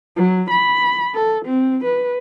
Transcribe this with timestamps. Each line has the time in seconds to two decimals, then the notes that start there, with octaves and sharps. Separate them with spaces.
0.16 F#3
0.51 B5
1.15 A4
1.45 C4
1.85 B4